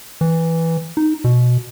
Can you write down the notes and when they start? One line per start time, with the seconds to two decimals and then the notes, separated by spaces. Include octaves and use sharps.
0.21 E3
0.97 D#4
1.24 B2